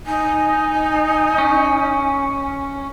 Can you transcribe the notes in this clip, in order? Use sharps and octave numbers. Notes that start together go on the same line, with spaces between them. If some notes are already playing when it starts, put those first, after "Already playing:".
D#4 G#5
C#4